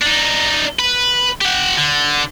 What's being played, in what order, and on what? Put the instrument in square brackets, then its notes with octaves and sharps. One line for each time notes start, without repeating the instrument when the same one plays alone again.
[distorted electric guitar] D4 D#4
B4
G4 F#5
D3